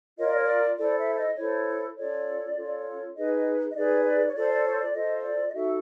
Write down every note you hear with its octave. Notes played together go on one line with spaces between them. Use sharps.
F4 A#4 C#5 D#5
D5
C#5
D5
E4 A4 C5 D5
E5
D#5
E4 A4 C5 C#5
C#4 F4 A4 C#5 D5
C#4 F4 A4 C#5
D#4 G#4 B4 D#5
D#5
D#5
D#4 G#4 B4 D5
D5
C#5
F4 A4 C5 D5
D5
C#5
D5
F4 A4 C5 D#5
D5
D#5
D#4 F#4 A4 E5